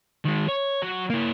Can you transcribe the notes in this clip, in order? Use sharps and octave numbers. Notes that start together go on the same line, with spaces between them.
D#3 G#3
C#5
F#3
A#3 E4